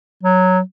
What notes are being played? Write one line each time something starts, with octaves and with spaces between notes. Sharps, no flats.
F#3